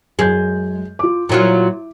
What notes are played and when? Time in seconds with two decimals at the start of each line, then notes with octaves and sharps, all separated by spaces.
0.19 F#2 G#3 G6
0.99 F4 D6
1.29 A#2 F#3 E4 F4